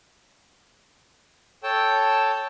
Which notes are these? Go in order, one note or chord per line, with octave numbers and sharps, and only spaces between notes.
A4 C#5 G5 A5